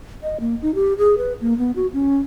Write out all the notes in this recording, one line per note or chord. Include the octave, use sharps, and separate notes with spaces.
D#5
A#3
D#4
G4
G#4
B4
A#3
B3
F#4
C#4